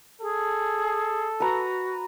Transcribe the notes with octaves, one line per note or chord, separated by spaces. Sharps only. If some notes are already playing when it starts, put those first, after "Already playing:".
G#4 A4
F#4 B4 A#5